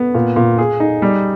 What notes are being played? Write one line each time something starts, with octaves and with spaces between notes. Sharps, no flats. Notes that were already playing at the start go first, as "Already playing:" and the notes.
Already playing: B3
A#2
A#2
G#4
D#4
G3